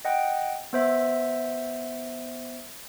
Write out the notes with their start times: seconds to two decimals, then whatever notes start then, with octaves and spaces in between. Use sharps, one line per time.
0.05 D#5 F#5 G5
0.73 B3 C5 E5